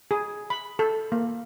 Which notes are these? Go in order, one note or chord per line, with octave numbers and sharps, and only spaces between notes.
G#4
B5
A4
A#3